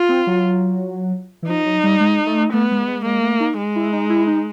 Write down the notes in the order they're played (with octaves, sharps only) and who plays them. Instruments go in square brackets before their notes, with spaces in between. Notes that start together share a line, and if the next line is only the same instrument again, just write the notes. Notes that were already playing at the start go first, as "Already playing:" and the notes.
Already playing: [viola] F4
[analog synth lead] C4
F#3
E3
[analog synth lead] F3 [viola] D#4
[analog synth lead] F#3
G3
G#3
A3
[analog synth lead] A3 [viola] B3
[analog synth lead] G#3
G#3
[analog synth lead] G#3 [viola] A#3
[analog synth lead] A3
D#4
[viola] G#3
[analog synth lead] E4
D#4
E4
D#4